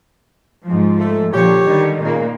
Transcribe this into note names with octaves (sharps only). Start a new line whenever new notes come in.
G#2 F3
A3
A#2 D3 F3 G4 C#5
D3 D#3 G3
A#2 C#3 A#3